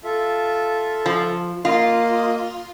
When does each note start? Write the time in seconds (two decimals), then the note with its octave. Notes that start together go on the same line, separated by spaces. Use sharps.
0.04 F4 A4 E5
1.06 F3
1.65 A#3 F4 D#5